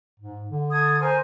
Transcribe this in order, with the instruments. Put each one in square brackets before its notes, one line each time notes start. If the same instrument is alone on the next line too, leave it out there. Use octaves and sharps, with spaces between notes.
[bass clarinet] G#2
D3
[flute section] A4 D#6 G#6
A#4 C5 G#5